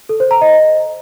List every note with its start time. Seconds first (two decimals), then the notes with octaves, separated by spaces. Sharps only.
0.09 A4
0.20 C5
0.31 A#5
0.41 D#5